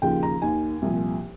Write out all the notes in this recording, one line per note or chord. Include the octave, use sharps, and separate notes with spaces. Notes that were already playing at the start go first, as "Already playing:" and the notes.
D#2 C#3 F3 G5
A#5
D#2 D#3 G#5
C2 A#2 F3